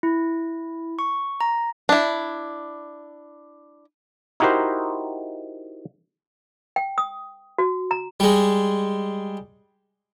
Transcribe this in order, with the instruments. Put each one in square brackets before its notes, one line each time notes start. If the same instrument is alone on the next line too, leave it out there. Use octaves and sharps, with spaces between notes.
[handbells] E4
C#6
A#5
[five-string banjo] D4 E4
[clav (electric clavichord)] D#4 E4 F#4 G4 A#4 C5
[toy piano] G5
D#6
F#4
A#5
[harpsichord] G3 G#3